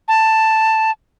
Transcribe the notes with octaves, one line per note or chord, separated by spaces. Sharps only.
A5